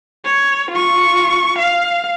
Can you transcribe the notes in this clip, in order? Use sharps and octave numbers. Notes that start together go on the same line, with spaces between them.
C#5
F4 C#6
F5